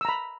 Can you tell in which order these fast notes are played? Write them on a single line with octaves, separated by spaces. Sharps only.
E6 A#5 B5